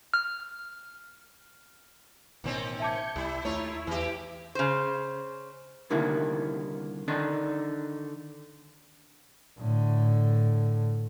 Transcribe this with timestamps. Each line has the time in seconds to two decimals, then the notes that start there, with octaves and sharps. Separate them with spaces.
0.14 F6
2.44 A1 B2 D#3 C4 C#4
2.80 E5 A5 D6 G6 G#6 C#7
3.16 C2 G3 E4
3.45 D#2 A3 D#4 F4 C#5
3.87 E2 E3 G4
4.55 C#3 C5
5.90 C2 D3 D#3 A#3 E4
7.08 D3 D#3 D4 D#4
9.59 A2 D3